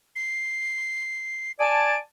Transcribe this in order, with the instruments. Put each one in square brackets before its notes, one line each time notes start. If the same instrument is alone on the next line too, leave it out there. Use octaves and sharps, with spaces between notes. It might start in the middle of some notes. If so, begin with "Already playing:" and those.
[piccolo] C7
[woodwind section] D5 G#5 A5 [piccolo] D7